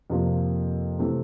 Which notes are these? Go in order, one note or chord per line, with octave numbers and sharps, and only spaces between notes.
F2 C3 F3 A#3
C3 E3 A3 C4